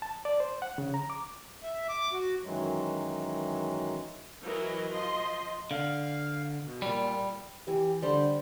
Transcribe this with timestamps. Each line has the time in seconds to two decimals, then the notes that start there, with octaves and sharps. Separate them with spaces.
0.02 A5
0.25 D5
0.40 C5
0.62 F#5
0.78 C#3
0.94 A#5
1.10 D6
1.63 E5
1.89 D6
2.13 F#4
2.41 F#2 D#3 E3 F#3 G#3
4.43 E3 F#3 E4 A#4 B4 D#5
4.91 F3 D#5 C6
5.71 D3 F5
6.63 B2
6.82 A#2 G3
7.68 E3 G4
8.03 D3 G3 C5